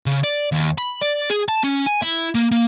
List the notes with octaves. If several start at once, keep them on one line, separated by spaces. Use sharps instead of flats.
C#3
D5
D#2
B5
D5
G#4
A5
C#4
G#5
E4
A#3
A#3